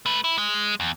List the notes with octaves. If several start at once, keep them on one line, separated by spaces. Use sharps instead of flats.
A3 B4
E4
G#3
E2